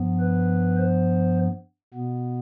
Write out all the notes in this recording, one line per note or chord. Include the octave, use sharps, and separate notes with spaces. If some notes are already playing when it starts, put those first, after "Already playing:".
Already playing: G2 F3 B3
B4
C5
B2 B3